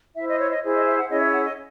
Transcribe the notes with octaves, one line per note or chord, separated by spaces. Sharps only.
E4 C5 E5
D#5
C#5
D#5
E4 G#4 C5
D#5
E5
F#5
C#4 E4 G#4 C#5 D#5
E5
F#5
D#5